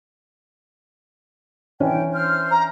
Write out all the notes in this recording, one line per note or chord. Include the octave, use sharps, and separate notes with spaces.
E3 C#4 D4 G5
C5 F6
A#5